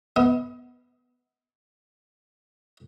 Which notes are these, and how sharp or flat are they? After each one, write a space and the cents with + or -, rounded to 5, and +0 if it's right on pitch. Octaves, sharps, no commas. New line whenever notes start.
B3 +0 D#5 +40